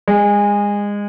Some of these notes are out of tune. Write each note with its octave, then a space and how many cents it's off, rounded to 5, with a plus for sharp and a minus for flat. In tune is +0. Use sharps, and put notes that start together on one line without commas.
G#3 -25